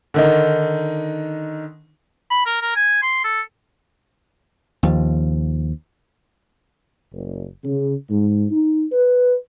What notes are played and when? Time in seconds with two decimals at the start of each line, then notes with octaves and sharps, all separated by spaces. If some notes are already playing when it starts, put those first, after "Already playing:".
0.14 D3 D#3 D#4
2.31 B5
2.46 A#4
2.61 A#4
2.76 G#5
3.02 C6
3.24 A4
4.83 D#2 F3
7.12 F#1
7.64 C#3
8.09 G#2
8.51 D#4
8.92 B4